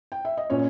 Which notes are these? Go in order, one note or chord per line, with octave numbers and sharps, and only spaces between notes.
G5
E5
D#5
A#2 C#4 C#5